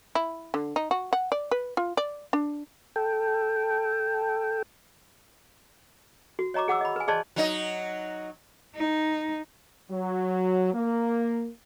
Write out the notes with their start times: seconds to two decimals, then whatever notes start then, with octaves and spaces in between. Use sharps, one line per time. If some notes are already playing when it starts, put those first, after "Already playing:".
0.15 E4
0.54 D3
0.76 D#4
0.91 F#4
1.13 F#5
1.32 D5
1.51 B4
1.77 F4
1.97 D5
2.33 D4
2.96 A4 G5
6.39 F#4
6.54 C#5 D#5 A#5 C#6 D6
6.68 G#4 F#5 D6 E6
6.81 D#5 B5
6.96 B4 G#5
7.08 G#4 C5 D5 D#5 A5 C6
7.36 F#3 D#4 D#5
8.76 D#4
9.91 F#3
10.73 A#3